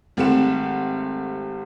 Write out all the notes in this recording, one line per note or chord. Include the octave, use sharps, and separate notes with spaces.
G#1 G3 A3 C4 F#5 E7